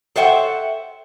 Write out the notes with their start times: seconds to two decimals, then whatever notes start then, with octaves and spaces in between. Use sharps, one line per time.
0.16 A4 C5 C#5 E5 F#5 G5